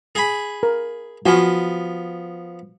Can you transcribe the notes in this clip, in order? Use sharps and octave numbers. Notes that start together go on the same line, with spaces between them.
G#4 G#5 B5
A#4
F3 B3 F#4 F5 G#5